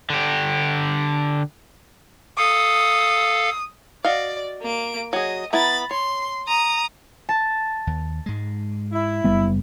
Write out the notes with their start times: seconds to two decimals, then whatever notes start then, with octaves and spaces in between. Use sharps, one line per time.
0.10 D3 G4
2.38 A4 F5 D#6
4.05 F#4 D5 D#5 F5
4.62 A#3 D7
5.13 F#3 G#4 D#5
5.53 B3 E4 A#5 B5 A6
5.91 C#5 C6
6.48 A#5 D#6
7.29 A5
7.87 D#2
8.26 G#2 G#3
8.92 E4
9.24 F#1 G3 B3